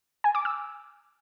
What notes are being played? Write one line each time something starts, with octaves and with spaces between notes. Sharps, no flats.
G#5
D6
E6